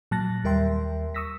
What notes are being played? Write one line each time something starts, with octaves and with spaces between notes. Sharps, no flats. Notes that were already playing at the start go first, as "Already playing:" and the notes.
A#2 F#3 A5 F#6 A6 A#6
D#2 G3 A#4 E5 G5 C6
C#6 D#6 E6 A#6 B6